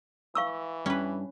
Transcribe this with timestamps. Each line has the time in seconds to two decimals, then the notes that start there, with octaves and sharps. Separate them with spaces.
0.35 E3 F5 C#6 E6
0.86 G2 C#4 B4